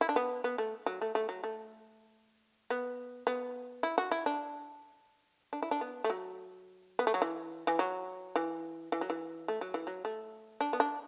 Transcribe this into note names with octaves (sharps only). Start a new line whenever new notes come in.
E4
D4
B3
B3
A3
F#3
A3
A3
F#3
A3
B3
B3
E4
F#4
E4
D4
D4
E4
D4
B3
A3
F#3
B3
A3
F#3
E3
E3
F#3
E3
E3
F#3
E3
A3
F#3
E3
F#3
A3
D4
B3
D4